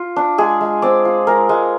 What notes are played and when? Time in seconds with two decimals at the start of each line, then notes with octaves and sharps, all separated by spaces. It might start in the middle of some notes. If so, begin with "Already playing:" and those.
Already playing: F4
0.16 D4
0.38 G#3 G#4
0.61 G#3
0.82 C4 D5
1.05 F4
1.27 G#3 A#4
1.49 G#3